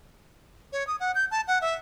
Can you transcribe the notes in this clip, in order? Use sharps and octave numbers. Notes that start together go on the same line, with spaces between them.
C#5
D#6
F#5
G6
A5
F#5
E5